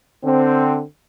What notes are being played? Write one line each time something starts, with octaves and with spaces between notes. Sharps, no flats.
D3 C4